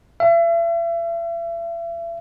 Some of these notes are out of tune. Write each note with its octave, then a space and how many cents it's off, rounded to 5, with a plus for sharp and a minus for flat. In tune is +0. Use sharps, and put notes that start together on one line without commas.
E5 +40